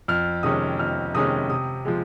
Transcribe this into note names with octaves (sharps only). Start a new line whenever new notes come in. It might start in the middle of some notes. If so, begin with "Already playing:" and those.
F2 F6
C3 D#3 G#3 C#4 D#6
F2 F6
C3 D#3 G#3 C#4 D#6
C3 D#6
F3 G#3